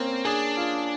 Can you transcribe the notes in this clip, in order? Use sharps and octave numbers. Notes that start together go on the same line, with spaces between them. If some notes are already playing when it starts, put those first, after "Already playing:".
Already playing: A#3 C4 C#4
D4 G#4
F4